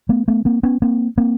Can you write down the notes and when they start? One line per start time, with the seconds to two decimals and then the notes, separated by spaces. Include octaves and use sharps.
0.09 A3 B3
0.28 A3 B3
0.45 A#3 C4
0.63 B3 C#4
0.82 A#3 C4
1.18 A#3 C4